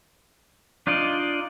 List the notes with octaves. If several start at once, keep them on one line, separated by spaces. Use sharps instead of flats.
D4 D#4 F4 D5 D#5